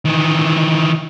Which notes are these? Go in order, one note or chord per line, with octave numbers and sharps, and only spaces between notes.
D#3 E3